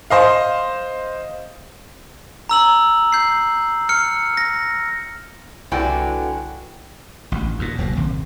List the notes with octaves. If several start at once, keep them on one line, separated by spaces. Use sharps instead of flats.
C5 D#5 F5
A#5 E6 F#7
G6 C7
F6 C#7
A#6
C2 D3 E4 F#4 B4 D5 G5 G#5
A1 D2
D#2 A#2
E1 C#2 F#3 A#3
D#1 G#1 D#2 C3